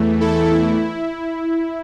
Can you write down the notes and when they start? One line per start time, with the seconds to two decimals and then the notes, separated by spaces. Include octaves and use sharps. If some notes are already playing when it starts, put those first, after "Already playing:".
Already playing: E2 E3 A3
0.20 E4 A4
0.51 E4